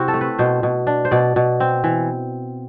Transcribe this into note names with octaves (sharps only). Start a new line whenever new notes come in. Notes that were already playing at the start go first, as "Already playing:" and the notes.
Already playing: C3 C4 E4 F#4
A4
A3
B4
B2 C5
B2
D4
C5
B2 D5
B2
C4
E3